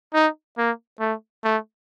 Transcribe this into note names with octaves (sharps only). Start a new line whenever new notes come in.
D#4
A#3
A3
A3